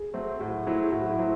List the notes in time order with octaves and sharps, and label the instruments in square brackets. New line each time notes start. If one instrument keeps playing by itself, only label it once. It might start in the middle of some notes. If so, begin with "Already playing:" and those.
Already playing: [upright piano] G#4
[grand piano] F#3 A3 C4
[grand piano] A2 [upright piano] F#4
[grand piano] F#3 A3 C4 [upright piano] E4
[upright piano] G#4
[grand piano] A2 [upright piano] F#4
[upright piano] E4
[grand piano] F#3 A3 C4